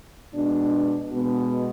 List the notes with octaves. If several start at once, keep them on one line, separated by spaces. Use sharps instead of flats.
B2 G#3 D4
B2 G#3 B3